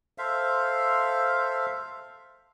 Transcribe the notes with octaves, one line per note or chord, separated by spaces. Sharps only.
A4 C5 E5 F5